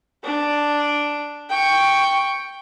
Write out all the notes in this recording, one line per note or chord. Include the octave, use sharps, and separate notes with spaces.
D4
G5 C#6